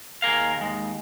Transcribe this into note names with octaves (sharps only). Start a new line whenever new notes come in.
D#2 G#4 A#4 F5
D#2 G#3